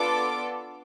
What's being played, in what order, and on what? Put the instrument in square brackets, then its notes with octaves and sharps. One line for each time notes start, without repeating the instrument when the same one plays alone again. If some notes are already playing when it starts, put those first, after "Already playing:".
Already playing: [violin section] B3 D4 F4 A4 D6